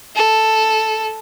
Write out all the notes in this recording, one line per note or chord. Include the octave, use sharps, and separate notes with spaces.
A4